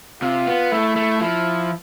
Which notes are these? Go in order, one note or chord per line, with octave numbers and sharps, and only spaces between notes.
C3 F4
B3
A3 E4
A3
F3 E4